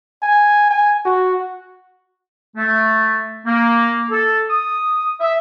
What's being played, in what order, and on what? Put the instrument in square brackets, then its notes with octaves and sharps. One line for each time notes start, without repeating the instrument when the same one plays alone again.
[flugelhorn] G#5
G#5
F#4
[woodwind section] A3
A#3
A4
D#6
E5